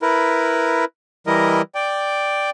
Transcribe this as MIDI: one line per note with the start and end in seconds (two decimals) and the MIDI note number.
0.02 0.85 64
0.02 0.85 70
0.02 0.85 71
1.27 1.62 52
1.27 1.62 55
1.27 1.62 64
1.27 1.62 70
1.27 1.62 75
1.75 2.50 74
1.75 2.50 79